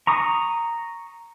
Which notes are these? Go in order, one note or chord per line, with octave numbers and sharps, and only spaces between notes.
A#5 C#6 D#6